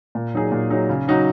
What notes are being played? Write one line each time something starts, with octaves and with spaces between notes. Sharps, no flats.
A#2
F#3 D#4 G#4
A#2
F#3 D#4 G#4
C#3
F#3 D#4 F#4